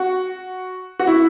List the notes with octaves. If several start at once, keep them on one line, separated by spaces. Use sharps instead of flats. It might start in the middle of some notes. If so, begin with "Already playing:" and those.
Already playing: F#4
F#4
E4